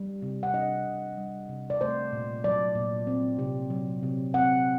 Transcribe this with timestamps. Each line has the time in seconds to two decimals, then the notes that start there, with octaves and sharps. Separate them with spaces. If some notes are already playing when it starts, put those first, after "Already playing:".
Already playing: G3
0.22 C3
0.43 F#5
0.53 D4 D#5
0.86 C3
1.17 G3
1.49 C3
1.70 D5
1.81 A3 C5
2.12 A#2
2.44 F#3 D5
2.75 A#2
3.07 C4
3.39 C3
3.70 F#3
4.03 C3
4.34 C4 F#5